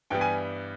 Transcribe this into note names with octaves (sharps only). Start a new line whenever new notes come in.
G2 E3 G3 B3 G5
G#5